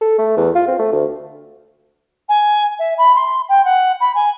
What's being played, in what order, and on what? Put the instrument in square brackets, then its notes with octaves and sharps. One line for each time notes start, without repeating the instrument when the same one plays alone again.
[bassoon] A4
A3
E2
F4
C4
A3
D2
[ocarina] G#5
E5
B5
C6
G5
F#5
B5
G#5